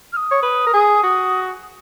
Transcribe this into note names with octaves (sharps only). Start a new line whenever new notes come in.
F6
D#6
C#5
B4
A#4
G#4
F#4